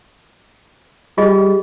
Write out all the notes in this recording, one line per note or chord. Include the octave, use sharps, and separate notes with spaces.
G3 F4 G#4 D#5